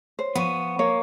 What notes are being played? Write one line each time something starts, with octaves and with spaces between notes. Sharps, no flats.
C5 C#5
F3 B3 F5 C#6 D#7
A#3 C#5